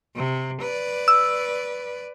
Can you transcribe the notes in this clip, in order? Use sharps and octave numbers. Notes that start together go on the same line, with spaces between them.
C3
B4 D5
E6